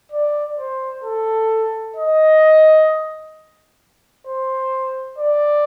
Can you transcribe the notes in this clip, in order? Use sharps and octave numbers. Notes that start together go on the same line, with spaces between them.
D5
C5
A4
D#5
C5
D5